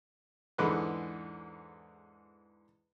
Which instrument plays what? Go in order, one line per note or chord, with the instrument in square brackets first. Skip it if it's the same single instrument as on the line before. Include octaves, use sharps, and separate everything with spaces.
[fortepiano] E2 G#2 D3 G#3 B4 F#6